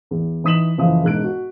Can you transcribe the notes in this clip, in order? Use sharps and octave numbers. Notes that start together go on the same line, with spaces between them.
E2
E3 D#4 D#6 B6 E7 F#7
F#1 E3 F3 F5 D#6
E1 G#2 F#6 D7
F#4